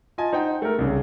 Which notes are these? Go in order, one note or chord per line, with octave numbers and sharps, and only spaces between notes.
F4 D#5 G#5 A5
D#4 C5 F#5 G5
A3 A#4
C2 C#3 C#4